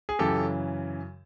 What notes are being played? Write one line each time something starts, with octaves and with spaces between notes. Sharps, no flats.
G#4
F#2 C#3 E3 G4 A4